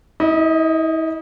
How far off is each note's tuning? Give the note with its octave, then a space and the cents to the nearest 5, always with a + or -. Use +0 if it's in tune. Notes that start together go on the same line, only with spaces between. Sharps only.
E4 -40 D#5 +0